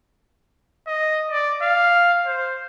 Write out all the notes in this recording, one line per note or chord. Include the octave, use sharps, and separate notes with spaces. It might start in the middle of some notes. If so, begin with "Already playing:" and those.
D#5
D5
F5
C5